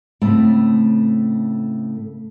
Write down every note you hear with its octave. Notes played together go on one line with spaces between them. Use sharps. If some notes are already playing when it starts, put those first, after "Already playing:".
A2 C#3 A3 C4